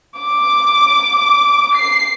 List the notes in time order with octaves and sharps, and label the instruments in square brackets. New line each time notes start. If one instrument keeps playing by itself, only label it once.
[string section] D6
C7